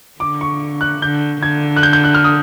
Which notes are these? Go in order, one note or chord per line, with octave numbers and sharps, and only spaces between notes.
D3 D6
C#6
F#6
D3 G6
D3 G#6
F#6
G6
G6
F#6
F6
D#6